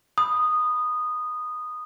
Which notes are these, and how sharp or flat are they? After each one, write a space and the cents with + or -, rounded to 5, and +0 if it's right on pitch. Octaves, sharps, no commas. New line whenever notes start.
B5 +0 D#6 -10